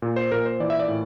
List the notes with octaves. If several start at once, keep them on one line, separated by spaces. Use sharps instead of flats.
A#2
C5
A#2 A#4
C5
E3 D5
E5
D5
A2